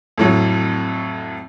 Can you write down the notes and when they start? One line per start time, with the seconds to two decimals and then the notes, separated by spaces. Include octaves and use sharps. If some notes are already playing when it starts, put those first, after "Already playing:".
0.18 F2 A2 F#3